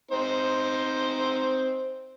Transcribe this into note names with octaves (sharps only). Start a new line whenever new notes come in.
C4 D#4 C5